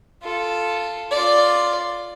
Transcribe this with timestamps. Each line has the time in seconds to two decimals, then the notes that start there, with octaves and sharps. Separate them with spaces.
0.22 F4 A4
1.11 F4 D5